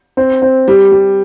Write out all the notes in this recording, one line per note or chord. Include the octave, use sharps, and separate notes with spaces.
C4
C4
G3
G3